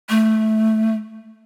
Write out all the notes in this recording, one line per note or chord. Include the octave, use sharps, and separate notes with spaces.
A3